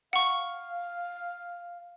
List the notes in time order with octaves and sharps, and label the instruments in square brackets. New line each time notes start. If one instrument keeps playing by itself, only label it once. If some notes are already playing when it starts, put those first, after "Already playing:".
[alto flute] F5 [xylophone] F#5 C#6